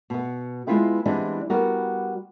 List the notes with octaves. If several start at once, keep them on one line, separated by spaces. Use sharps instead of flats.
B2 B3
G#3 B3 E4 F4 B4 G5
E3 G3 G#3 B3 C4 D4
G3 B3 F#4 A#4